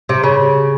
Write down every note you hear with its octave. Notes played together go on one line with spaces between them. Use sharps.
C3
C#3